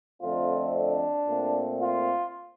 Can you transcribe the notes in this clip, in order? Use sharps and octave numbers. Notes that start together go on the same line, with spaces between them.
F2 D3 A3 C4 F4
D4
A#2 A3 C4
F4